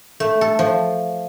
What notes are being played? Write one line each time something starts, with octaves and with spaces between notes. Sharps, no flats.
A3
A4
F3